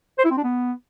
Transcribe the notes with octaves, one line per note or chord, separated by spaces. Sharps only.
C5
E4
C4
D4
B3